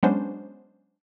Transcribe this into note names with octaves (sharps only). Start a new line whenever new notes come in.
F#3 G#3 B3 C#4 D4 C5